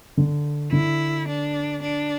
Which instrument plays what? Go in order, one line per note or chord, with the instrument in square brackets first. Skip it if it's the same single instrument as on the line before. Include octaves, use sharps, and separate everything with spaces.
[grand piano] D3
[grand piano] D3 [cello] E4
[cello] D4
D4